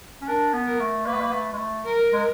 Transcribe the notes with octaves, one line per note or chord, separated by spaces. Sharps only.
C#4
D4 A#4
B3
A#4
A3
A#3 B4
A3
A#3
A3
G#3
A3
A#4
G#3